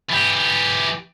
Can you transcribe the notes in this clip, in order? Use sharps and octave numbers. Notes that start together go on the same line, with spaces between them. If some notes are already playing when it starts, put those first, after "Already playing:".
E3 G4